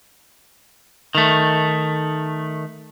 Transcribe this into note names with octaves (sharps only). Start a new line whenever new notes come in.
D#3 A3